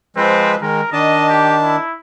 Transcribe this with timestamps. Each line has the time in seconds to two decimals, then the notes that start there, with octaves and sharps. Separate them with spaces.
0.16 F3 G#3 C4 B4
0.62 D#3 G#3 A#4
0.93 D#3 D4 D#5 A5
1.29 G4
1.63 E4